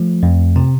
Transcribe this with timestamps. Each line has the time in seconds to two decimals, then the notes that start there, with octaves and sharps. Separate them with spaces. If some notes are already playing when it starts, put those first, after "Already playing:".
Already playing: F3 A3
0.23 F2
0.56 C3 C4